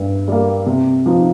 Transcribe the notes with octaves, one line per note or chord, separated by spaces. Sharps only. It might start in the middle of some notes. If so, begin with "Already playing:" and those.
Already playing: G2 G3
G3 A#3
C3
F3 D#4